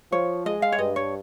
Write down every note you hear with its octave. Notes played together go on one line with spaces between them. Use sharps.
F3 C#5
G#3 D#5
F5
C#5
G2 D#5
C#5